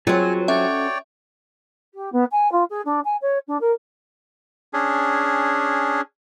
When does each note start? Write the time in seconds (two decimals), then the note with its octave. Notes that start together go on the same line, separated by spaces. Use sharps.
0.07 F#3 C4 F4 G#4 B4 C#5 G#5
0.48 C#4 F#4 A4 C#5 D5 E5 G5
1.94 G4
2.12 B3
2.31 G#5
2.52 F4
2.70 G#4
2.85 D4
3.04 G#5
3.21 C#5
3.48 D4
3.61 A#4
4.73 C#4 D4 G#4